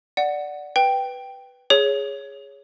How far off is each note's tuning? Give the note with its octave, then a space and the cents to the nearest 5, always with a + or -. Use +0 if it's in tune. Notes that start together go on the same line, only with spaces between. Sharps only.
D5 +0 F#5 +0
B4 +0 G5 +0
G#4 +0 C#5 +0